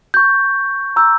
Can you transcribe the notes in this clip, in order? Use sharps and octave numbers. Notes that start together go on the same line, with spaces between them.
C#6 G6
A#5 E6 G6